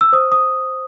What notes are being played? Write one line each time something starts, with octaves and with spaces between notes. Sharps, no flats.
E6
C5 D#6
D#6